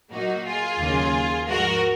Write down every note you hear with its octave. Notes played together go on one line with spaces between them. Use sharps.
A#2 F#3 A#3 D#4 F#4
F4 G#4
D#2 C#3 F#3 A#3
G#2 F3 G#3 F#4 A#4